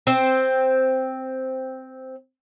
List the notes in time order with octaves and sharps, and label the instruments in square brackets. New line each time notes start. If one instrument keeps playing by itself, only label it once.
[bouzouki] C4 C5